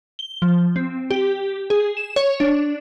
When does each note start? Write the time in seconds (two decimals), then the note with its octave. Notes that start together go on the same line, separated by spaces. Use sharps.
0.19 G7
0.42 F3
0.76 C4
1.11 G4
1.70 G#4
1.97 E7
2.16 C#5
2.40 D4